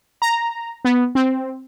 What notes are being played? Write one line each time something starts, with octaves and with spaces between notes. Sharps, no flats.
A#5
B3
C4